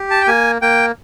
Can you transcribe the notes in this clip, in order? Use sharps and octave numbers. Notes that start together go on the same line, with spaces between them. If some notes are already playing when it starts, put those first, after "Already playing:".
Already playing: G4
A5
G5
A#3 G#5
A#3 G5